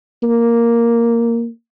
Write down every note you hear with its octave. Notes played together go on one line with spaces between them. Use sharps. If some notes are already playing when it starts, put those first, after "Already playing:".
A#3